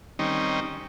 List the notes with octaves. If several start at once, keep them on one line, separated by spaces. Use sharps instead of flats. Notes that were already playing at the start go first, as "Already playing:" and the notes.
D#3 G3 C4 C#4 D#4